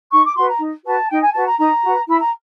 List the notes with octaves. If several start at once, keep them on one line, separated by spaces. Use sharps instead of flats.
D#4 C#6
D6
F#4 B4 C6
A#5
D#4
F#4 B4 A5
D#4 G5
G#5
F#4 B4 A5
A#5
D#4 A#5
F#4 B4
E4 B5
A#5